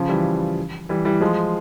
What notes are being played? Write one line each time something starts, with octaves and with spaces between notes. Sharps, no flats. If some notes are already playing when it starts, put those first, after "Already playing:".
Already playing: C#3 F3
E3 G3
E3 G3
E3 G3
F3 G#3